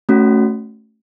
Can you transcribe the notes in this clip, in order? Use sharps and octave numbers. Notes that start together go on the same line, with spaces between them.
A3 C#4 F#4